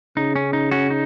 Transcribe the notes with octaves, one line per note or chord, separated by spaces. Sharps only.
C#3 D#4
C#4
D#4
C#4 F#4
D#4